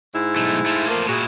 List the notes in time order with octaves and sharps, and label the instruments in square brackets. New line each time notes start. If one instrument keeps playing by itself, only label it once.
[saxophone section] G#2 E4
[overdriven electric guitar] B1 A3
A3 F4
[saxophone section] F3 A#3
[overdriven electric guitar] A#2 E4 [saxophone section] F#4 G#4